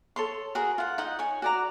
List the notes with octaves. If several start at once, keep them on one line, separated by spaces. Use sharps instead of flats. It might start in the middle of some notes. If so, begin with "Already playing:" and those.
A4 C#5 C6
F#4 G#4 A#4
F4 F#5
D#4 D#5 F#5
C#5 G#5
F#4 D5 A#5